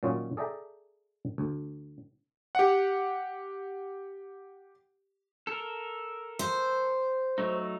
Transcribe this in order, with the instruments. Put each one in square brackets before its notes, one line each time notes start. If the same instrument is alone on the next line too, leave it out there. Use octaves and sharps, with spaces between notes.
[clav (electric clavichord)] A#2 D#3 F#3 C#4 F4 D#5
G#4 A4 D5 E5 G5 A#5
D2
[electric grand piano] G4 F#5
[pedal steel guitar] A4 A#4
[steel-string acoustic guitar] C5
[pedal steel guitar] F#3 A3 D#4